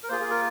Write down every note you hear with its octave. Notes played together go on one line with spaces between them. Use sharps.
A#4
A#3 F4 G#4 C5
G#4
A#4